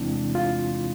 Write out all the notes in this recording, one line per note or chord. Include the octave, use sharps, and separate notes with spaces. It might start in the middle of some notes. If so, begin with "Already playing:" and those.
Already playing: E2 C3 E3 G#3 C4 D4 E4
F4